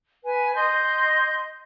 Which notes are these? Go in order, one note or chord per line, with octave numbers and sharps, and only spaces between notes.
B4 G#5
D#5 C6 G6